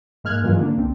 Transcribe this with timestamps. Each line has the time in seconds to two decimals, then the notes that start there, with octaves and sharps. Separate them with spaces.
0.24 G#2 G#3 A#3 F6 F#6 G#6
0.42 G2 D#3 E3 F#3 G#3 F4
0.58 D3 A#3 D4
0.77 C2 C4